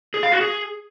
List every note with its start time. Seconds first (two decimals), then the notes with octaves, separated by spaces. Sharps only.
0.14 G#4
0.23 F5
0.32 F#4
0.41 G#4